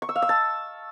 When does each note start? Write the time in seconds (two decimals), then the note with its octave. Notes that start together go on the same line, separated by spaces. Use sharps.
0.02 C#6
0.09 E6
0.16 F5
0.22 E6
0.29 A5